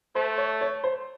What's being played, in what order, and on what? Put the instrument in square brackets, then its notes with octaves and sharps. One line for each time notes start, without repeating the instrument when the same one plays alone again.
[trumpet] A3 [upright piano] C5
[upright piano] C#5
C#5
C5